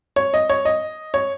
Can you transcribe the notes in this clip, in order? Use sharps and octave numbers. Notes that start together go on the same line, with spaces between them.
C#5
D#5
C#5
D#5
C#5